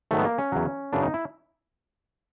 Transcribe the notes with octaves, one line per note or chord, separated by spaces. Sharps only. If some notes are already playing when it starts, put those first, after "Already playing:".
G#2 D#3 F#3 A3
B3
A#3
C#4
E2 C#3 F#3
F#2 C#3 E3 D4
D#4
E4